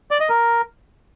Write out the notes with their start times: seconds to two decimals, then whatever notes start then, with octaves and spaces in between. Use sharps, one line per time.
0.11 D5
0.20 D#5
0.29 A#4